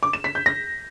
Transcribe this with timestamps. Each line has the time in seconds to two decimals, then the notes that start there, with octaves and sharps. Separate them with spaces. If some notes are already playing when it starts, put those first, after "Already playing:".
0.03 D6
0.13 E7
0.24 B6
0.35 G6
0.46 A#6